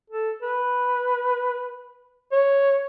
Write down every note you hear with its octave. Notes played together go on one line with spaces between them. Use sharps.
A4
B4
C#5